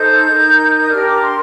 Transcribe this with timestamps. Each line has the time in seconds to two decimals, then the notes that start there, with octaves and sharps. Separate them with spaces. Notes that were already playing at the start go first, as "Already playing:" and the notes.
Already playing: D#4 A4 C5 G6
0.31 D#4 A#4
0.82 D#6
0.91 D4 G4 A#4 F6
1.06 D6
1.13 A#5
1.21 C6